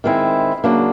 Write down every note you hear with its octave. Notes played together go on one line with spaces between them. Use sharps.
D#3 G#3 C4 E4
C#3 F#3 A#3 D4